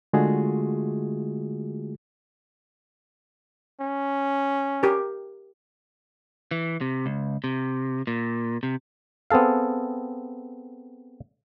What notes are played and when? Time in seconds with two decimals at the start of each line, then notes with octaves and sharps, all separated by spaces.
0.13 D3 G#3 A3 F4 F#4 G#4
3.81 C#4
4.83 G4 A#4
6.51 E3
6.81 C3
7.06 C#2
7.44 C3
8.07 A#2
8.63 C3
9.30 B3 C4 G#4 A4 F5